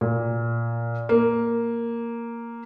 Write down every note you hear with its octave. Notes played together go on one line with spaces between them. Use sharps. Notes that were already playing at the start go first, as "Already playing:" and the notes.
A#2
A#3